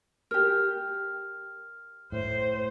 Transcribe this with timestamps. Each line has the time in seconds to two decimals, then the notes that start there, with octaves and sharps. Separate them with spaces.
0.31 G4 A#4 F6
2.12 A2 C5